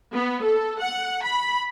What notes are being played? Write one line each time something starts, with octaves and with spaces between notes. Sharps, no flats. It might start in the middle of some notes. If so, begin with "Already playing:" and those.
B3
A4
F#5
B5